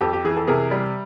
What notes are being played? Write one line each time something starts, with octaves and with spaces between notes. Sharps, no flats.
F2 G4 A4
G4
E3 G#4
A4
C3 G#4 A#4
G3